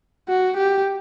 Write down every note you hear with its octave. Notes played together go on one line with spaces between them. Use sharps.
F#4
G4